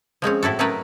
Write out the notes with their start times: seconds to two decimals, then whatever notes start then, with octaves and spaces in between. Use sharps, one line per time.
0.22 F3 G#3 C4 C#4
0.43 A2 E4 F#4 A4
0.59 F#3 A3 C#4 D#4 A#4 B4